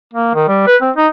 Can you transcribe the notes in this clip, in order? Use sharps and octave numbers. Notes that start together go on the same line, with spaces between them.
A#3
D#3
G3
B4
C4
D#4